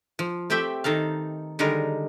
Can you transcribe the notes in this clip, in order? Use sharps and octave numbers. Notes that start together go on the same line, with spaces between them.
F3
A3 C4 G4 E5 G5
D#3 D#4 A4 F5
D3 D#3 G3 G#3 A#4